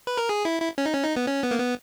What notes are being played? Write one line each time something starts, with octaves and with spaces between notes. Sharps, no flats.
B4
A#4
G#4
E4
E4
C#4
D#4
C#4
D#4
B3
C#4
B3
A#3
B3